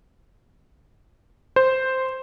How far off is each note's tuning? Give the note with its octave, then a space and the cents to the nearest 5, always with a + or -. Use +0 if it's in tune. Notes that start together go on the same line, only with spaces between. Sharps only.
C5 +0